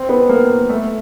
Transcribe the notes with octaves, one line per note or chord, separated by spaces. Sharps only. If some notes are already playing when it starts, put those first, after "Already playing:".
Already playing: C4
B3
A#3
A3